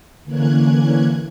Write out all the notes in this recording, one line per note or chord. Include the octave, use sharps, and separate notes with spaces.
D3 E3 A#3 C#4 F#6 G#6